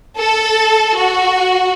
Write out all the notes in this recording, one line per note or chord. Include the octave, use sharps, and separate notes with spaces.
A4
F#4